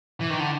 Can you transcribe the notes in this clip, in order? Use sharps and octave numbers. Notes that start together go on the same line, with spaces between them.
E3
D#3
D3